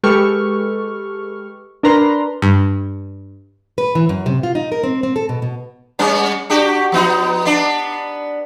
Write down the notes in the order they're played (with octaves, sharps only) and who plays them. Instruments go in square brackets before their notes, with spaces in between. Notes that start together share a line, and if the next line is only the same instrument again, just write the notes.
[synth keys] G#3 G4 A4 B4 C#6 F6
D4 A#4 B4 A#5 C6
[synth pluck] G2
[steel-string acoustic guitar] B4
E3
F#2
C3
F4
D#4
A#4
C4
C4
A4
B2
B2
[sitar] G3 B3 C#4
D4 F#4 G4
F3 B3 D#4
B3 D4